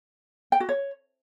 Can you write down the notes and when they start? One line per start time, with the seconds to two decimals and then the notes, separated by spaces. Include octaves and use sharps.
0.52 G5
0.60 F#4
0.69 C#5